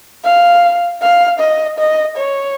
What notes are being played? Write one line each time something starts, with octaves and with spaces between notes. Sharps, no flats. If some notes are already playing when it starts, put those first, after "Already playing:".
F5
F5
D#5
D#5
C#5